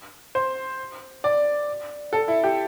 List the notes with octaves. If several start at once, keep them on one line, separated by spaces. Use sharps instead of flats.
C5
D5
A4
E4
G4